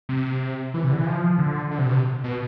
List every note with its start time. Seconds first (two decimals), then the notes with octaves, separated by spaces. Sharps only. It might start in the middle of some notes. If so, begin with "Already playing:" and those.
0.09 C3
0.74 E3
0.84 C3
0.92 D3
0.99 E3
1.06 F3
1.39 D3
1.71 D3
1.78 C3
1.86 B2
1.92 C3
2.24 B2